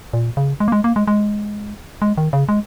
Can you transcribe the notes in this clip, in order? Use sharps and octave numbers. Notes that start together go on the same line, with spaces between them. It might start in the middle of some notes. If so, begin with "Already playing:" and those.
A#2
C#3
G#3
A#3
G#3
A#3
G#3
G#3
G#3
D#3
C#3
G#3